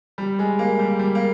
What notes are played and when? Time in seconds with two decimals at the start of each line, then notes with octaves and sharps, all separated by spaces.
0.18 G3
0.39 G#3
0.59 A#3
0.79 G3
0.99 G3
1.15 A#3